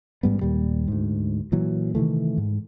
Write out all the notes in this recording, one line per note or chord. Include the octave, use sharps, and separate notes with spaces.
A1 G#2 G3 B3
D#2 A#2 G3
D2 G#2
A#2 E3 F#3
C3 D#3 E3 A3
G#2